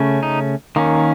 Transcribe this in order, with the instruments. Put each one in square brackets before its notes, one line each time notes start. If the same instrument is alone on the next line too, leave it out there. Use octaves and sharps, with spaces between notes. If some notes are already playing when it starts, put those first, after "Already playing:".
Already playing: [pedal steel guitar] C#3 A3 C#4
D#4
D#3 A#3 C#4